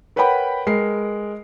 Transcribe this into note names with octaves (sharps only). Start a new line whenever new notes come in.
A#4 B4 C#5 F#5 G5 B5
G#3 A#4 C7